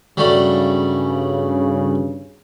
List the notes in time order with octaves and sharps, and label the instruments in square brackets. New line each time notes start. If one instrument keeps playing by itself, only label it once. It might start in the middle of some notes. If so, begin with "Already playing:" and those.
[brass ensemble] G2 C#3 [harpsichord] F#3 G3 A3